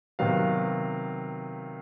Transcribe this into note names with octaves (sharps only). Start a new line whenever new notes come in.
C3 D#3 F#3 B3 F5